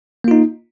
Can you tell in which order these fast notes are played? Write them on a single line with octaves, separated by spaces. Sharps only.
A#3 F4 D#4